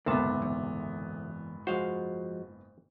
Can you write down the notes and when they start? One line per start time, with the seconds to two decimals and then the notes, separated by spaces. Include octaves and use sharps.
0.06 F#1 D2 G#2 C3 D#3 A#3 B3 A5
0.42 E2
1.67 F3 G#3 F#4 C5 F5